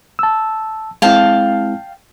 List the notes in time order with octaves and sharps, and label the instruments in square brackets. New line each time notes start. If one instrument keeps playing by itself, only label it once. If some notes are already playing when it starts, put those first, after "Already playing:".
[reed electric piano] A5 E6
[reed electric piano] G#3 C4 E4 [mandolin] F5 G5 A5